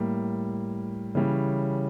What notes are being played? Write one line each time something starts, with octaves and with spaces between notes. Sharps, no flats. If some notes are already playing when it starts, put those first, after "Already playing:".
Already playing: A2 G3 A#3
C#3 E3 G3 C#4